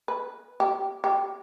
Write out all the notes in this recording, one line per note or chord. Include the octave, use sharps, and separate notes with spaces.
B4
G4
G4